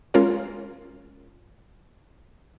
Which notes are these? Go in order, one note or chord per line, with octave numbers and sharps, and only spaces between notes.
G#3 C#4 F4 A#4 C#5